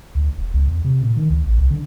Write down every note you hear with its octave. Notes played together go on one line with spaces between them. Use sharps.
D2
E1
C#2
E2
C3
A#2
D#3
D2
A1
C2
D3